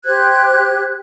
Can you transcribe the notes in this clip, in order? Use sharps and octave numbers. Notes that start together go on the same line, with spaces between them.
G4 C5 F#6 G#6